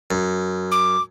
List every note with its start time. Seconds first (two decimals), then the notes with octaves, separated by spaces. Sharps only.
0.11 F#2
0.71 D6